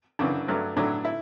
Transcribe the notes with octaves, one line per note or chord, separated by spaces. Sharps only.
F#2 C#3 E3 D4
G2 F#3 A3
A2 F#3 A3 D4
E4